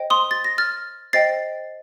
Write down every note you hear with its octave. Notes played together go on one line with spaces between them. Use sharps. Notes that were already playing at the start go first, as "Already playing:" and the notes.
Already playing: C5 D#5 G5
C6 D#6
A6
A#6
F6 A6
C5 D#5 G5 A6 C7